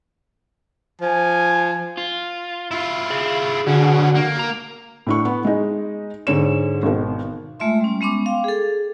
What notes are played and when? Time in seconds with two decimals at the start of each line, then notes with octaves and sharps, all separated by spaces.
1.01 F3 G#5
1.97 F4
2.71 E4 F4
3.10 G#4 F5
3.67 B2 D3 C#4 F#4
4.15 A#3
4.39 A#5
5.07 A2 D4 C#6
5.25 B3
5.45 G#3 D#4
6.27 G#2 D3 C#5 E7
6.83 G#1 B2 D#3
7.60 G#3 A3 F4 E5 C6
7.80 G3 C#4
8.01 G#3 B3 C#4 C6 D6
8.26 F5 G5
8.44 G#4 A4